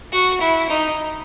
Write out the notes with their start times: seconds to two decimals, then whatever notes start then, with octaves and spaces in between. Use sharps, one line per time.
0.13 F#4
0.41 E4
0.70 D#4